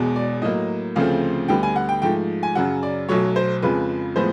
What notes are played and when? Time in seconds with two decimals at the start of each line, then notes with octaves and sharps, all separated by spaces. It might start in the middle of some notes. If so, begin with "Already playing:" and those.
Already playing: E1 E2 B2 G#3
0.16 D5
0.42 A2 F#3 A#3 D#5
0.96 D2 C#3 F3 A3 C4 F5
1.48 D2 D3 G3 B3 G5
1.63 G#5
1.76 F#5
1.89 G5
2.02 G#2 F3 A3 G5
2.43 G#5
2.55 F#2 C#3 F#3 F#5
2.83 D5
3.09 B1 B2 F#3 A3 C#5
3.36 C5
3.62 F2 C#3 F3 G#3 B4
4.16 A2 F3 G#3 B3 C5